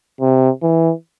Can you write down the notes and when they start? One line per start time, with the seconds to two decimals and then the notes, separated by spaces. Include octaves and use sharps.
0.21 C3
0.63 E3